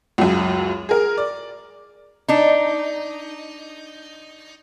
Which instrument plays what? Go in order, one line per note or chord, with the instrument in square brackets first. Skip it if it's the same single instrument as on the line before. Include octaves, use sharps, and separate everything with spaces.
[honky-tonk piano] C#2 F#2
G#4 A#4
D5
[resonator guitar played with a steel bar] D4 D#4